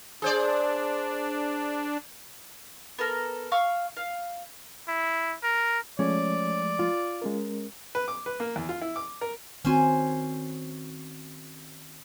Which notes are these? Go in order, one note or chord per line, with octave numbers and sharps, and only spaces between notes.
D4 G#4 C5 D5
B3 A4 A#4
F5 C#6 E6
F5
E4
A#4
F3 G#3 A3 C#4 D5
F4
G#3 C#4 A#4
B4
D6
B4
A#3
E2
F4
E4
D6
A#4
D#3 C4 C#4 F#4 C5 G#5